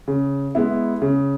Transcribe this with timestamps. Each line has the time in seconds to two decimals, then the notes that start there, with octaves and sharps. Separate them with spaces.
0.08 C#3
0.55 G#3 B3 E4
1.02 C#3